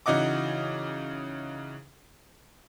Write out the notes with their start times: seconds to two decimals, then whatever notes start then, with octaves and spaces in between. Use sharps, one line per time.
0.06 C#3 E3 D#4 F#4 D#5 D6